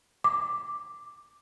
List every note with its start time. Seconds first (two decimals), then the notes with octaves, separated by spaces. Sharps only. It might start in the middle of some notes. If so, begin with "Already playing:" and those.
0.24 D6